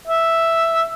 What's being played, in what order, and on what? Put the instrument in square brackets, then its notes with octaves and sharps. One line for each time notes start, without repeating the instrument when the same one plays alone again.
[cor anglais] E5